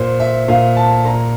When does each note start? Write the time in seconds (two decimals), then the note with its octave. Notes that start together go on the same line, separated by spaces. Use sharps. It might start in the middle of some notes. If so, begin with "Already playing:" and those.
Already playing: A#2 C5
0.20 E5
0.48 A#2 F5
0.76 A5
1.05 A#2 A#5